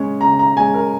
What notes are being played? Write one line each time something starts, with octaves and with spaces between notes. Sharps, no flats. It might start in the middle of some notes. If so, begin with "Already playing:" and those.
Already playing: C#3 G#3 C#4
C#3 A#5
A#5
G#3 C#4 G#5
A#4